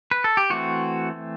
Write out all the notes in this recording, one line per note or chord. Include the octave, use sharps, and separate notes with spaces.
B4
A4
G4
E3 A3 C4 F#4